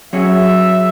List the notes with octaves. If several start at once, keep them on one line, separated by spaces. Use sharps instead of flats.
F#3 C#4 G#4 C#5 E5